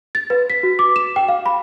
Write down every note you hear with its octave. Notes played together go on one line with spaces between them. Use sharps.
A6
B4
B6
F#4
D6
E7
G5
F5
B5